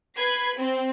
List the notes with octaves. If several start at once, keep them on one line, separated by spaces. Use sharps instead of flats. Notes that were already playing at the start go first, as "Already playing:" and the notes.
B4 B5 G#6 C7
C4